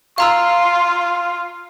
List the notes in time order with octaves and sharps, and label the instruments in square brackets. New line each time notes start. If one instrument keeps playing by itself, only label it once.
[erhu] F4 [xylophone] F5 A#5 E6 [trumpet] C6